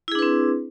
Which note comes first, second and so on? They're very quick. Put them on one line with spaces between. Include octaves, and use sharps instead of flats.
E4 G#4 D4 B4 C4